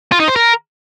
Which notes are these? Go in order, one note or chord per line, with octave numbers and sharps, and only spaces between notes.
F4
D#4
C5
A#4